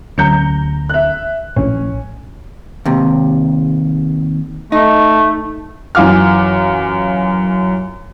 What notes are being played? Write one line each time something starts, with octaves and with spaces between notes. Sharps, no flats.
D2 F#3 C#4 A#5 G6 C#7
E5 F#6
A#1 A2 C#4
D#2 C3
A3 D#4
F#2 E3 F4 D6 F6